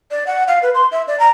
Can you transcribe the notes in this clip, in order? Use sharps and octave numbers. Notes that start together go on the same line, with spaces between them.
D5
F#5
F5
B4
C6
E5
D5
A#5